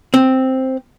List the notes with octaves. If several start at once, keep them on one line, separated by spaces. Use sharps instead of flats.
C4